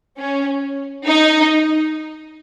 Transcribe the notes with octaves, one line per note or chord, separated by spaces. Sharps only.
C#4
D#4